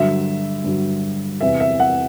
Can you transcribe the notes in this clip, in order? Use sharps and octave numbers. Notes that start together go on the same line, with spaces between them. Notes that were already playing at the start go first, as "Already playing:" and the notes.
Already playing: G2 D3 F#3 E5
G2 D3 F#3
E2 C3 E3 E5
E5
F#5